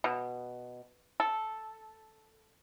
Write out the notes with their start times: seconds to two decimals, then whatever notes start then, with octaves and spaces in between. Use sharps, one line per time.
0.04 B2
1.20 A4